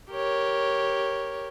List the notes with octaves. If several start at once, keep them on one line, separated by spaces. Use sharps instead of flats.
G4 A#4 C#5